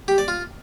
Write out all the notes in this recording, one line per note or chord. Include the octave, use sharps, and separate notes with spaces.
G4
D5
F4